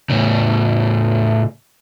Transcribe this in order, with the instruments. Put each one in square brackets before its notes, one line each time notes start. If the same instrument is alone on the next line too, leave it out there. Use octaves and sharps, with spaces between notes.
[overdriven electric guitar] A2 C#3